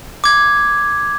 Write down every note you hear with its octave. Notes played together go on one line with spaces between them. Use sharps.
D6 G#6